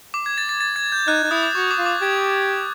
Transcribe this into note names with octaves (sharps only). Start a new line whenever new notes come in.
D6
G#6
A6
A6
A6
G#6
G6
D#4 F#6
D#4
E4 D#6
D6
F#4 C#6
D6
F4
D6
G4 G#6